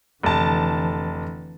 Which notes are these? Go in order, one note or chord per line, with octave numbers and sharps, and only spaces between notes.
F1 D3 E3 A5